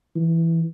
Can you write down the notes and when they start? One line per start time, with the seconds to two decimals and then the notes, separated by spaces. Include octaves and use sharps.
0.15 E3